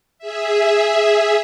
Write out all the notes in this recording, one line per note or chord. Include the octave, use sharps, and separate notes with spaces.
G#4 E5